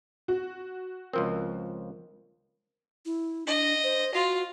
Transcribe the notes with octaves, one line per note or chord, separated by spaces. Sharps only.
F#4
C#2 F3 C4 A#4
E4
D4 D#5
C5
F4 F#4